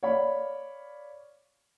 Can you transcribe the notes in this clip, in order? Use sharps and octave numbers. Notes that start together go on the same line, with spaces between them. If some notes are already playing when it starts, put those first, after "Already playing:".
C#5 D5 F5 B5